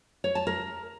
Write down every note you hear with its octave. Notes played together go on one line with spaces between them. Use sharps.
C#5
A5
A#4